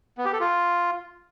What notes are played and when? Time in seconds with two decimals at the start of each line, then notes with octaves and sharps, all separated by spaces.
0.18 B3
0.25 G4
0.33 A4
0.40 F4